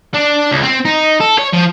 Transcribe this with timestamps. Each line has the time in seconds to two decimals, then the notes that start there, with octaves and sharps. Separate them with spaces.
0.14 D4
0.51 C#2
0.63 C4
0.85 D#4
1.20 A4
1.38 C#5
1.53 F3